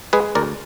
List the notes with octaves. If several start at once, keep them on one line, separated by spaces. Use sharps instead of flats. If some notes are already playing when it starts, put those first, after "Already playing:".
G#3 G#4 B4
D2 A#4 D5